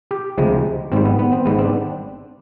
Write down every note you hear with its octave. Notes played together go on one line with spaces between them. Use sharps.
G4
D2 C3 F3 G#3
G#1 G#2 G3 C4
B3
B3
C4
G#1 G#2 G3 B3
C4
D4